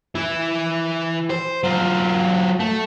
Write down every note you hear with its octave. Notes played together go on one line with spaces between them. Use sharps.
E3 E4
C5
F#3 F4
A3